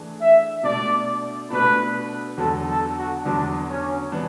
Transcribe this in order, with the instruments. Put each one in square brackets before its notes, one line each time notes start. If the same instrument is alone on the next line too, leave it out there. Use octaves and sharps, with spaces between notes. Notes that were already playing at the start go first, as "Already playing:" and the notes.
Already playing: [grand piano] E3 A3 D4 G#4
[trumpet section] E5
[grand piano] B2 A3 D4 [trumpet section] D5
[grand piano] B2 A3 D4 [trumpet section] B4
[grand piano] E2 D3 F#3 [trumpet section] A4
[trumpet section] A4
F#4
[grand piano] E2 D3 F#3 [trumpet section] D4
[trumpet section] C#4
[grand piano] E3 B3 D4